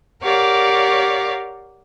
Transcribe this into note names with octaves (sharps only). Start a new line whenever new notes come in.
G4 A#4 C#5 D5 F5 F#5